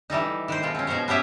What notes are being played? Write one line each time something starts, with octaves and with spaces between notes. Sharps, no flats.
E3 G3 A3 D#4
D#3 B4 C5
B2 D#3 G#3 F4
C4 C#4
B2 F3 D#4 C5 C#5
B3 C#4 G4 E5 G#5